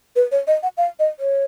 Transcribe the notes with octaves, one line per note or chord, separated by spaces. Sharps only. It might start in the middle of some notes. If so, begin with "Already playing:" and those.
B4
C#5
D#5
F#5
F5
D#5
C#5